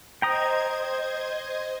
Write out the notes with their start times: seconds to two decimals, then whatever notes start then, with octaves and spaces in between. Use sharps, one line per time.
0.22 C5 D#5 G5 A#5 D#6 G#6